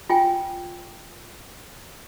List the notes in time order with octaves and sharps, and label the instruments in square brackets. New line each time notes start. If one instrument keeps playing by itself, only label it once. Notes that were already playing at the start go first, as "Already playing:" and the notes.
[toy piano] F4 G5 G#5